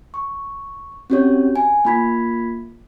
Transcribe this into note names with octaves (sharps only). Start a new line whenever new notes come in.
C#6
C4 C#4 F#4 G4 C#5
G#5
A#3 F4 B5 G#6 B6